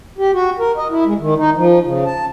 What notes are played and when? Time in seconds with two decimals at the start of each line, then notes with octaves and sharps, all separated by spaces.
0.18 G4
0.34 F#4
0.59 A#4
0.77 D#5
0.90 E4
1.06 G#3
1.19 D#3
1.38 D#4
1.56 F3
1.85 C#3
2.05 A5